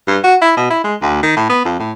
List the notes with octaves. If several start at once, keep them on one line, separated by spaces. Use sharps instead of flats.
G2
F#4
E4
B2
E4
G#3
D2
D#3
A2
B3
F2
A2